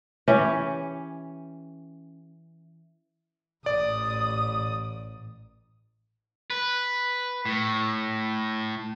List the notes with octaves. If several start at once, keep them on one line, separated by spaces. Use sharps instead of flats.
E3 C#4 G4 C#5
A1 D5 D#6
B4
A2